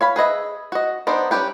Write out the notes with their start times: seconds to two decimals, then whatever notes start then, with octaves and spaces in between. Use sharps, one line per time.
0.01 C#5 F5 B5
0.16 G#4 B4 D#5 E5
0.72 F#4 D#5
1.07 B3 D4 D#4 A#4 C5
1.31 G3 C#4 E4 G4 B4